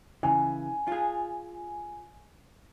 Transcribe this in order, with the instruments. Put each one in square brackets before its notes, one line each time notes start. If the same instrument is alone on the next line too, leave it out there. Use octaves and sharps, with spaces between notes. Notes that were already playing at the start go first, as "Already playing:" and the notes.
[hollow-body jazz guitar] C#3 E3 [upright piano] G#5
[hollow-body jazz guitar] F4 G#4